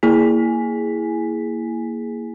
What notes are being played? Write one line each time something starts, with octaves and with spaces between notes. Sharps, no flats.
A#3 E4 G#4 G#5 B6